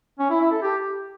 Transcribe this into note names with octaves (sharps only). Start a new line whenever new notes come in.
C#4
E4
E4
A4
G4